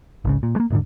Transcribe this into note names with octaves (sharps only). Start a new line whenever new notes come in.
G#1 C#2 C#3
A#2
G#3 A#3
D#1 G#2 D3